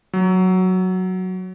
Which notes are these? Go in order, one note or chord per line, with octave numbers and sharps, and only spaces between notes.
F#3